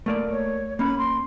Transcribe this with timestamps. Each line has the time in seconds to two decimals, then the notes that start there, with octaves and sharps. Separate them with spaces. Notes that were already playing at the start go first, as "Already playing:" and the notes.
0.06 A3 A#3 D5
0.31 C#5
0.79 A#3 C#4 B5
0.98 C6